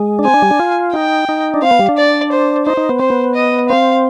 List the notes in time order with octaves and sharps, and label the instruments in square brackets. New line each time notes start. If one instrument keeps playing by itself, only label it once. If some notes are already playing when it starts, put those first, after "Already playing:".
Already playing: [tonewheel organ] G#3
D4
[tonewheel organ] C4 [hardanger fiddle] G#5
[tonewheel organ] D4
G3
D4
F4
[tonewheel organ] D#4 [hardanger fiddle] G5
[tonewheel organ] D#4
D4
[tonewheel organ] C4 [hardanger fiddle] F5
[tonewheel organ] B3
G3
D4
[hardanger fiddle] D5
C5
[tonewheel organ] D#4 [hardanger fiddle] C5
[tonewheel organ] D#4
B3
[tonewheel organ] C4 [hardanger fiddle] C5
[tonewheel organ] B3
[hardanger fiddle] D#5
[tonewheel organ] C4 [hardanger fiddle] F5